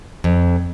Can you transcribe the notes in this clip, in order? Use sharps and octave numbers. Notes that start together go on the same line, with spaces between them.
F2